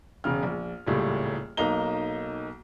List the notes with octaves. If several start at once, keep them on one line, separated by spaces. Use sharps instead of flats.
E1 C#3 F6
A#1
D#1 C#2 A2 G3
B1 A#3 D#4 A#5 G7